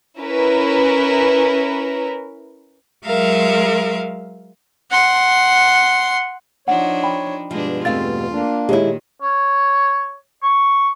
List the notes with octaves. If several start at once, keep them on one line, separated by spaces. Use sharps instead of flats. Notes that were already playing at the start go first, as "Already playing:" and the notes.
C#4 E4 A#4 B4
F#3 G#3 A#4 E5 F5
F#5 C6
F3 D4 D#4 C#5 F#5
G5 B5
G2 B2 F3 G#3 D4
E2 A3 C4 F4 F5 A6
A#3 D4
A#2 D#3 G#3 E4 G4 C#5
C#5
C#6